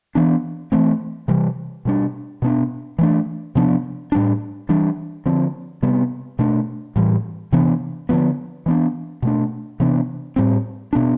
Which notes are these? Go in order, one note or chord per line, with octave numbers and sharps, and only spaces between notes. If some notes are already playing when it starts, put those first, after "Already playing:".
E3 B3 D4
E3 A3 C4
C3 E3 G3
B2 G3 D4
B2 B3 D4
E3 A3 D4
C3 F3 B3 D4
A2 G3 D4
E3 G3 D4
D3 F3 C4
C3 G3 B3
B2 A3 D4
A2 E3 G3
C3 E3 B3 D4
D3 F3 B3
E3 B3 D4
B2 A3 D4
C3 E3 B3 D4
A2 G3 C4
B2 B3 D4